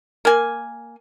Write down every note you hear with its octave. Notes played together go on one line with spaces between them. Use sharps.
A#3 G#5